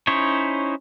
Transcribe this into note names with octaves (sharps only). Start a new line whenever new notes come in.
C#4 D#4 E4 C5 C#5